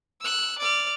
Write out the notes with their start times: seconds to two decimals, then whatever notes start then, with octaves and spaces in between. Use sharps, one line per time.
0.21 E6 F#6
0.58 D5 F6